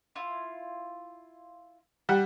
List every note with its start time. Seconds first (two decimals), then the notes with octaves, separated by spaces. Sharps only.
0.16 E4 F4
2.09 G3 F#5